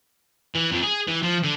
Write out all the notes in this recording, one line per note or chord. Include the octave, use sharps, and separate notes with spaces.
E3
F2
G#4
E3
F3
D3